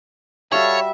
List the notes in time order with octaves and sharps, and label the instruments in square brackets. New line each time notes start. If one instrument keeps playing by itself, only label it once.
[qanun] G3 F#4 [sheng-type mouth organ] A4 F5 [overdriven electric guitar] C#5 [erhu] E5